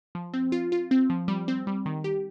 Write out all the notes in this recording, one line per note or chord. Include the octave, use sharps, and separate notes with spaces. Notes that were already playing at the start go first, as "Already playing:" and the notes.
F3
C4
F4
F4
C4
F3
G3
C4
G3
D#3
G4